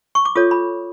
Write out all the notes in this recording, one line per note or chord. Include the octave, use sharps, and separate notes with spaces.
C#6
D6
F4 A4 C#5 D#6
B5